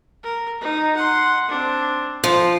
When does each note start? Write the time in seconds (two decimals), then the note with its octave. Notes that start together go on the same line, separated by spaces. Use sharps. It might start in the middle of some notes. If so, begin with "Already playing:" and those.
0.23 A#4
0.61 D#4
0.96 F#5 C6
1.49 C4 D4
2.24 F3 C5